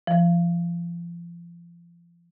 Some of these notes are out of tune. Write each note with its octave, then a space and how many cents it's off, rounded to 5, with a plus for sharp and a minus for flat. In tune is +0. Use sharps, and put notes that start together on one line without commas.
F3 -35